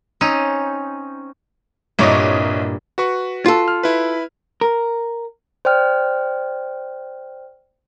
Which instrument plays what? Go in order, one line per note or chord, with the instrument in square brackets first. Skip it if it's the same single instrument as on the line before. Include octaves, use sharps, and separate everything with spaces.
[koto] C4 C#4 D#4
[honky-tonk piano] C2 C#5 D#5 [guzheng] G2 A#2
[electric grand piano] F#4 B4 C#6
[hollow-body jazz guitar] F4 A4
[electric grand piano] F6
E4 B4
[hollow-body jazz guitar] A#4
[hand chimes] C5 D5 G5 F6